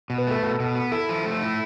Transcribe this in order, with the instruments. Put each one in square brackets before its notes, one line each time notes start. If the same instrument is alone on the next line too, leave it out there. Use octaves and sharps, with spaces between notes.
[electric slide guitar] B2
[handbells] B4
[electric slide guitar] A3 [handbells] A4
[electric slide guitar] B2 [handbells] A4
[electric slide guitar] B2
B3
[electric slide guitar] E4 [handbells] A4
[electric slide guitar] F3
A3
E4